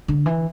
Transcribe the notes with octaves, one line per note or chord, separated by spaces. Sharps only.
D3
E3